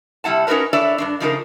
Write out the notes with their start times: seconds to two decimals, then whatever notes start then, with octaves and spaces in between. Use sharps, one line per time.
0.24 C3 G3 E4 F#5 A5
0.47 C#4 D#4 F#4 A#4 B4 C#5
0.73 D4 E4 A4 C#5 D5 E5
0.98 G2 C3 D4
1.20 C#3 F3 G#3 A3 D#4 A#4